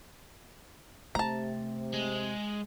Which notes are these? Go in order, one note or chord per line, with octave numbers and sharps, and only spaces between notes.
C3 A3 A5 A#5
G#3